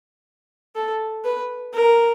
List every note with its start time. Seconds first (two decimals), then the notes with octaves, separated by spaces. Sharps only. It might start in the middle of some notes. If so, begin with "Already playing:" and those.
0.75 A4
1.24 B4
1.74 A#4